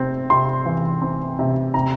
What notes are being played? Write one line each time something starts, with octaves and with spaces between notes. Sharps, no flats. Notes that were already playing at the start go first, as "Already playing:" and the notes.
Already playing: C3 C4
C3 C6
E3
C4
C3
C3 A#5